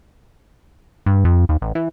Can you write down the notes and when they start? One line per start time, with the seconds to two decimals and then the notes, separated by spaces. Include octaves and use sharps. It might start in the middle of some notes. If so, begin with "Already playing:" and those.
1.06 G2
1.25 F2
1.49 D#2
1.61 A1
1.75 E3